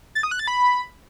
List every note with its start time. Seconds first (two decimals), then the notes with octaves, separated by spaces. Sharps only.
0.15 A6
0.23 D#6
0.31 F#6
0.39 A6
0.47 B5